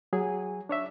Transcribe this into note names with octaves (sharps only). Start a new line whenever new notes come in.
F#3 G#4 G#5
D4 C#5 E5